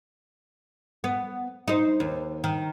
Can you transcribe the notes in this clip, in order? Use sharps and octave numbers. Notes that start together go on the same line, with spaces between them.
B3
D#4 C5
D#2
D#3